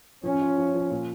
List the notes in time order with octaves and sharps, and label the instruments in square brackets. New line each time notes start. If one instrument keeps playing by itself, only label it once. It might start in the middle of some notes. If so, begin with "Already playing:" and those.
[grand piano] F3 [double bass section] C#4
[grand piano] F4
F3
F3
A#2